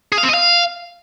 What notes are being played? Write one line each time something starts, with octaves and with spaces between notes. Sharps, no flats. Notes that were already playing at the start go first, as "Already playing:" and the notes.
G#4
F5
C4
D#5
F5